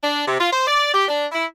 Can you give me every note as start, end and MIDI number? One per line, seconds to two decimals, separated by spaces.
0.03 0.23 62
0.27 0.36 48
0.39 0.51 65
0.52 0.63 72
0.67 0.93 74
0.94 1.07 67
1.08 1.26 62
1.32 1.45 64